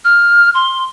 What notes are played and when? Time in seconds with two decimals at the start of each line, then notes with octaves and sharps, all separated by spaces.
0.05 F6
0.54 C6